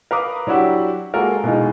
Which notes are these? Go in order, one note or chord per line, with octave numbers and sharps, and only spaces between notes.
A#4 B4 F5 A#5 D6 D#6
F#3 D4 E4 F#4 G4
G#3 A#3 F4 F#4 A4 A#4
B2 E3 G#3 D#4 F4